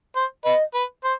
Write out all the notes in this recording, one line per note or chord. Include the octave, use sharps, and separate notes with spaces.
C5
B4 D#5
B4
C5